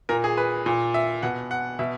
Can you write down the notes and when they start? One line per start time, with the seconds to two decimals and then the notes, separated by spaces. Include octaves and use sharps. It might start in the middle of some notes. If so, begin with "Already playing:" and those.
0.09 A#2 A#4
0.24 G#4
0.37 B4
0.66 A#2
0.94 E5
1.23 B2 F#5
1.51 F#5
1.79 B2 E5